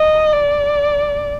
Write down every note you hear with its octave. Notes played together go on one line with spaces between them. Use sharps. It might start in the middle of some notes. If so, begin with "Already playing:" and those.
Already playing: D#5
D5